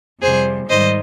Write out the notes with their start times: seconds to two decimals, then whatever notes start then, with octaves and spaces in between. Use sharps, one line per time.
0.22 F2 C3 G3 G#4 C5
0.69 G#2 D#3 G3 C5 D#5